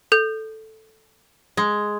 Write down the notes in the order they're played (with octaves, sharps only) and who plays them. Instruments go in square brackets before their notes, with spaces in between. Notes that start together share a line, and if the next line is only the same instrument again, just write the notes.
[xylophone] A4 G6
[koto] G#3